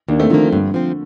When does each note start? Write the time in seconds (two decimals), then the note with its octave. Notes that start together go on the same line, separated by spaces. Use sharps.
0.08 D#2 A#3 D4
0.19 A3 C4
0.30 D3 D#3 F3
0.34 A#3
0.41 D3
0.52 G2 D3
0.74 F3 C4